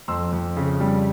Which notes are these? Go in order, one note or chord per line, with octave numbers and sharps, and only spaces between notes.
F2 C6 E6
F2
C#3
G3